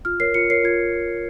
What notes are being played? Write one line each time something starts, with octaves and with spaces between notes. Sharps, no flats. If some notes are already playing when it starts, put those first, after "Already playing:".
F4 F6
A#4 C#5 C7
F4 C#7
A#4 C#5 C7
F4 G#6